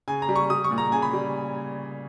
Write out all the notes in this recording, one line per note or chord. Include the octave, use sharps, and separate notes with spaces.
C#3 G#5
A#5
G3
C#6
G3 D#6
C#6
A#2
A#5
C#3 G#5
B5
G3